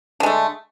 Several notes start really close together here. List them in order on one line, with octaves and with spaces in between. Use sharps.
D3 G#3 A3